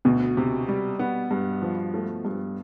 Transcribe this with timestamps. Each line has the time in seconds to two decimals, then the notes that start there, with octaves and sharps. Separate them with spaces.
0.05 D2 B2
0.37 C3
0.68 G3
0.99 B3
1.31 G2
1.62 F3
1.94 A3
2.25 G2